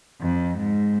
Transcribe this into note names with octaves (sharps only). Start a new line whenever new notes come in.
F2
G#2